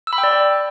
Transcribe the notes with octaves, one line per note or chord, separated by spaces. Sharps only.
E6
B5
G5
D5